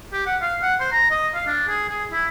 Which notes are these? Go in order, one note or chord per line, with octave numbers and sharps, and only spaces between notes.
G4
F#5
F5
F#5
C5
A#5
D#5
F5
D4
G#4
G#4
E4